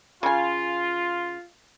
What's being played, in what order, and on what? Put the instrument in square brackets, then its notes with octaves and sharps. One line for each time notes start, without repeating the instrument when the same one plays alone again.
[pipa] C#3 G#5 [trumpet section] F4